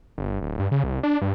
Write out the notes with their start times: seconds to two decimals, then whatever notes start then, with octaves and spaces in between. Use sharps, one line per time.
0.18 G1
0.41 D1
0.59 G2
0.71 C#3
0.84 C2
1.03 D4
1.21 G2